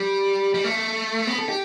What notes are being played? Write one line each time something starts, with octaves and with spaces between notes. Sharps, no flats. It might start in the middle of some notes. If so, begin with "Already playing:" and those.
Already playing: G3
G3
A3
B3
A4
G4